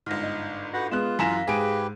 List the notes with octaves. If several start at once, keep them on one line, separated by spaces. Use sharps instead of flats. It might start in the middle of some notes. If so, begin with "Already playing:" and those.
G1 G#2 F6 A#6
D#5
F#4 A4 B4 F#5 G6 A#6
G#3 B3 F4 F#6 E7
F#2 E3 F5 G#5 A#5 A#6 B6 E7
G#2 G4 G#4 B4 D7 D#7